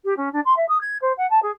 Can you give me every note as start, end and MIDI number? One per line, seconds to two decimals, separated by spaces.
0.04 0.14 67
0.16 0.29 61
0.32 0.40 62
0.45 0.53 84
0.56 0.65 76
0.68 0.78 87
0.81 0.97 92
1.01 1.12 72
1.17 1.28 78
1.30 1.39 81
1.42 1.51 68